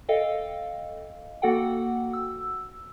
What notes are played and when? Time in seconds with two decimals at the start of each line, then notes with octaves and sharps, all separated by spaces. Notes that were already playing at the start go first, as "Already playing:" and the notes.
0.09 A4 D#5 F5 G5
1.42 A#3 F#4 A4 F#5 G5
2.13 E6